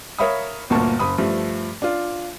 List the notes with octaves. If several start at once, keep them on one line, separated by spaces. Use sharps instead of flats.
A#4 C#5 E5 F5 B5 D#6
G1 D2 A#2 A#3 A5 C#6
F#1 B5 D#6
G2 F3 A3
D4 F4